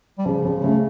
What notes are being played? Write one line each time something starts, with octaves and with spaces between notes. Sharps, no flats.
G3
C#3 F3
C#3 F3
C#3 A3